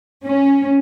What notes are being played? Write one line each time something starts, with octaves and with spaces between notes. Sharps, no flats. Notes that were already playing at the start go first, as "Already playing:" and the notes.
C#4